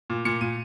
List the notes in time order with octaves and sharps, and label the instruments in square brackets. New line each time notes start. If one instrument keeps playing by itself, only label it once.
[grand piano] A#2
A#2 C#7
A#2 D#7